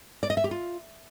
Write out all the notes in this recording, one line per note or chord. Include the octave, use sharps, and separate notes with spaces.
D5
D#5
E5
G4
F4